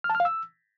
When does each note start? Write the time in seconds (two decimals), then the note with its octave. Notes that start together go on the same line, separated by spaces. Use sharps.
0.04 F6
0.10 A5
0.15 F6
0.20 F5
0.25 E6